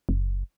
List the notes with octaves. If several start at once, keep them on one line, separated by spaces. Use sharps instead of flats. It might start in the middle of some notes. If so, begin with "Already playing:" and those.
F#1